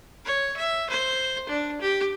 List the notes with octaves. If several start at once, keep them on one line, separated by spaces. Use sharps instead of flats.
C#5
E5
C5
D4
G4